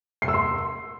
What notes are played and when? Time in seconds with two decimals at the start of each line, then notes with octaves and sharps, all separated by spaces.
0.22 C7
0.28 E6
0.34 C6